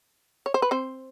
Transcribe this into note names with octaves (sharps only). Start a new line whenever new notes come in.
C#5
C5
B4
C4 C5